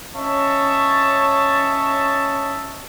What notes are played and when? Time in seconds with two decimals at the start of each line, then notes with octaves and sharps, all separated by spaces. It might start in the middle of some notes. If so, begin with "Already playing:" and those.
0.15 C#4 C#5 D#5 E5 A5